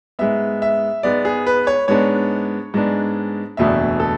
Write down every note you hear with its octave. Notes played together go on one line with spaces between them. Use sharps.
G#2 G#3 B3 E5
E5
G#2 G#3 B3 D5
G#4
B4
C#5
G#2 G#3 B3 D4 C#5
G#2 G#3 B3 D4
F#1 E2 B2 A3 D4 E5
A4